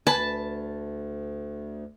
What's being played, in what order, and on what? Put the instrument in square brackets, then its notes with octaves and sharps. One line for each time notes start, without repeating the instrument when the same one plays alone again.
[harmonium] D2 [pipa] B4 G#5 B5 [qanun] A5